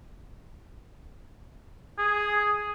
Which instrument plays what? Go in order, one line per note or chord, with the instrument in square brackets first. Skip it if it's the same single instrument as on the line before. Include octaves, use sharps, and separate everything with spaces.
[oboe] G#4